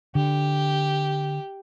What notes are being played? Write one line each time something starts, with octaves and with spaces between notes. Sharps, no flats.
D3 G4